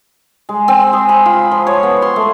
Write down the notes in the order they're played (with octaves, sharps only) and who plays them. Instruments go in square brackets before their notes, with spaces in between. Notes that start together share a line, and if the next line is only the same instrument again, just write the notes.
[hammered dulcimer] G#3
C4
G#4
B5
F4
F3
C#5
B3
C6
A3